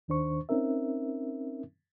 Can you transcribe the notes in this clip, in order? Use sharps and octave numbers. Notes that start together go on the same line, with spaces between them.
D#2 D#3 D4 C5 C#6
C4 C#4 D#4 A#4 E5